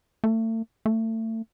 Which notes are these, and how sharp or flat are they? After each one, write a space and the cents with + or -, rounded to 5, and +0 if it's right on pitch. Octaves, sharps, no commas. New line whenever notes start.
A3 +35
A3 +30